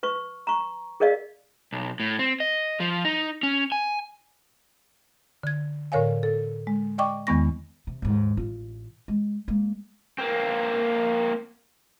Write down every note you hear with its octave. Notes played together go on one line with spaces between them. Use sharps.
B4 C#6
A#5 C#6
G#4 A#4 D5 D#5 F5
B1
A2
C4
D#5
F3
D#4
C#4
G#5
D3 G#6
A2 D3 A#4 C#5 F5 G#5
A4
G#3
D5 D#5 G5 C#6 D6
E2 D#3 G#3 B3 C#6 A#6
C3
D#2 G#2
A1 F4
G#3
G#3 A#3
A#3 C4